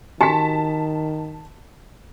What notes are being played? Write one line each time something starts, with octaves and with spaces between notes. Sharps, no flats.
D#3 F#4 G4 G#5 A5 B6